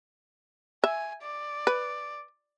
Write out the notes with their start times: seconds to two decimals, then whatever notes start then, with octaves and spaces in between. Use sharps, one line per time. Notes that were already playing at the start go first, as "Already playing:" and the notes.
0.84 E5 G#5
1.23 D5
1.67 B4